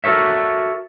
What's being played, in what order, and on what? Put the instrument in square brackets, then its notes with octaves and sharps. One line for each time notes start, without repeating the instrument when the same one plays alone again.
[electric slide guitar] F#4 A4 A#4 C#5 E5